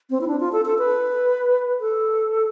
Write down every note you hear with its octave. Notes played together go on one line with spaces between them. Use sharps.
C4
E4
D4
F4
A4
A4
B4
A4